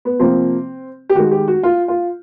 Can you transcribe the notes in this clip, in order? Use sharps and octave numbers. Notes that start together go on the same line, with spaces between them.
B3
C3 F3 A#3 C4
G4
D#3 G#3 F#4
G4
F#4
F4
F4